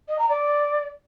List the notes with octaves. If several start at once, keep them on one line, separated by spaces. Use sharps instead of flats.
D#5
A#5
D5